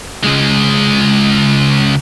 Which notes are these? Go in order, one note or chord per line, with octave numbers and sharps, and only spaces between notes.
C#2 G#3